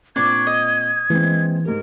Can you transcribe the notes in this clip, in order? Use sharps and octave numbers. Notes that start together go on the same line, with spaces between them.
A#2 C4 D4 C#6 G#6
D#5
E3 G#3 A#3 C4
G#2 G4 A#4